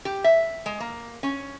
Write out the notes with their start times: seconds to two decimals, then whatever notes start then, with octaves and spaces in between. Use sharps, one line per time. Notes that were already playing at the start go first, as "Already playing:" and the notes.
0.05 G4
0.24 E5
0.66 G#3
0.80 A#3
1.23 C#4